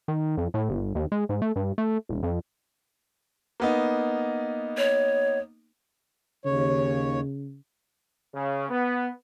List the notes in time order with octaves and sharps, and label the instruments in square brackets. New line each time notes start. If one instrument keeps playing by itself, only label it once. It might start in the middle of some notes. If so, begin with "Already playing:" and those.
[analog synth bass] D#3
F2
A2
G1
D#2
G#3
G#2
A3
G2
A3
E1
F2
[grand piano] A#3 B3 D#4
[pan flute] C#5
[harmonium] D#2 C#5 [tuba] C#3
[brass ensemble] C#3
B3